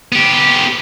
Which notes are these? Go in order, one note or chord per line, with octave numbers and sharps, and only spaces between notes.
B3 G4